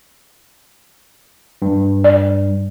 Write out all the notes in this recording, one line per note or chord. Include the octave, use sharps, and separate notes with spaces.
G2
D5